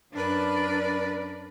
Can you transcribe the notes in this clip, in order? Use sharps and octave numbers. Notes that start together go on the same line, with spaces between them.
F#2 D4 A#4 B4 D5